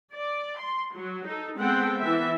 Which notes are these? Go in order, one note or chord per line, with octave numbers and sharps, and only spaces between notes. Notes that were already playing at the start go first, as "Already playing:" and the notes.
D5
C6
F#3
D#4 A4
G#3 B3 C4 A4 F#5 G5
E3 B3 E5